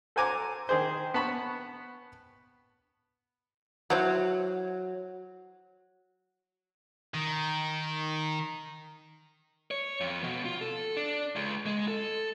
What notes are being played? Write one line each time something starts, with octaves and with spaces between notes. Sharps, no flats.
A4 C5 F#5 G#5 A#5 D6
D#3 G#4 C5
B3 A5 B5 C#6
F#3 E4 C5 F#5
D#3
C#5
F2
B2
F4
A4
D4
C#2
G#3
A4